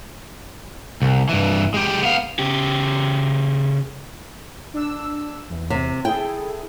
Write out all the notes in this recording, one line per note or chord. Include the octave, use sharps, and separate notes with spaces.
C2
G2 E3
G#3 G4
B3 F5
C#3 G4
D4 E6
E2
C3
E4 G#4 A4 G5